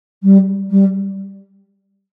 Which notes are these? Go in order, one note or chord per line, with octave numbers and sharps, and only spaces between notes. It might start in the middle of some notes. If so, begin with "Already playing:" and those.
G3
G3